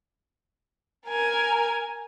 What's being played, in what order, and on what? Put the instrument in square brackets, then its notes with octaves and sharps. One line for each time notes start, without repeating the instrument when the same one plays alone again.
[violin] A#4 G#5